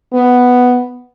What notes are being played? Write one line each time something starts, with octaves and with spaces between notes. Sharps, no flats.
B3